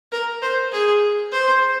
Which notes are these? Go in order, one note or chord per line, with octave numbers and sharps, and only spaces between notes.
A#4
C5
G#4
C5